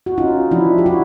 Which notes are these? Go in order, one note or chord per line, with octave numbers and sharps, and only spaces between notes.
F#4
C#4 D#4 F4
F3 D4 E4
G4
F3 E4 F#4